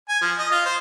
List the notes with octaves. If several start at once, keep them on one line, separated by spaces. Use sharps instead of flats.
G#5
F3
D#5
F4
C5